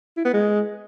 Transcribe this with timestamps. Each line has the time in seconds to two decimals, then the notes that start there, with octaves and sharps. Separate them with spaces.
0.17 E4
0.25 B3
0.33 G#3